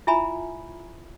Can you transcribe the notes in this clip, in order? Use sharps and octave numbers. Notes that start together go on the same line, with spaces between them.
E4 F4 E5 G#5 A#5 B5